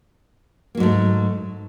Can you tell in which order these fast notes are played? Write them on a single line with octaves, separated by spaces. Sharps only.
A#3 F#3 G#2 A3